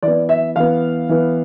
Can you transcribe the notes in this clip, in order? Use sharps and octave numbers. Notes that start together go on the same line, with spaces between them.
E3 B3 D5
E5
E3 B3 F5
E3 B3